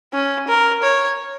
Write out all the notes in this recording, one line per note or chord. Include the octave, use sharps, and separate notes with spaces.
C#4
A#4
C#5